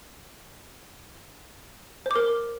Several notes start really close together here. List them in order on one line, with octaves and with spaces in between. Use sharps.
C5 D6 A#4